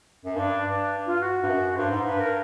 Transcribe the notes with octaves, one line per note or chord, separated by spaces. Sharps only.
F#2
G2 D4
G2
F4
F#4
G2
F#2
G2 C5
G#2
G2 B4
A#4